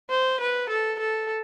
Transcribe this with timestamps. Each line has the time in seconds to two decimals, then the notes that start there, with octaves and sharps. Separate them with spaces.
0.10 C5
0.41 B4
0.70 A4
1.00 A4